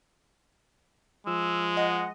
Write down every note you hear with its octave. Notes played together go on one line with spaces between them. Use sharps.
F3 G#3 E6
D#5 F#5